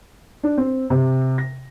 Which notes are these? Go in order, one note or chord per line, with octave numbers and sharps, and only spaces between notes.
D4
C4
C3
A#6